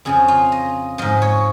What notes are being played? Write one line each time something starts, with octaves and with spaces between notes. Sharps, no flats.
F2 C#3 F3 G#4
F4
D#5
G#2 F3 D#5
C#5